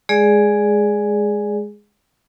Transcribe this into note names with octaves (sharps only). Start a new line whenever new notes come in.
G#3 G#4 D5